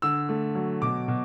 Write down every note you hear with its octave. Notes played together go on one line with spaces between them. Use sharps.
D3 E6
A3
F#3
B2 D6
B2